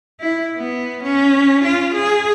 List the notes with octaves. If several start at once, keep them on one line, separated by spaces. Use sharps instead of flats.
E4
B3
C#4
F4
G#4